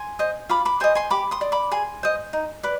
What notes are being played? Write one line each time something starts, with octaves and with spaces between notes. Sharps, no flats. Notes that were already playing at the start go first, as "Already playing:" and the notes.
Already playing: G#5 C6
C5 D#5
F4 B5 D6
B5 D6
C5 D#5 G#5 C6
G#5 C6
G4 B5 D6
C6 D#6
D5
B5 D6
G#4 G#5 C6
C5 D#5
D#4
B4 D5